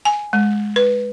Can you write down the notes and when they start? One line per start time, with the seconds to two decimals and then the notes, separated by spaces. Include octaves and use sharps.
0.05 G#5
0.33 G#3
0.76 B4